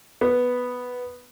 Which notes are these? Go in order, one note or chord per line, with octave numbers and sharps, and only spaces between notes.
B3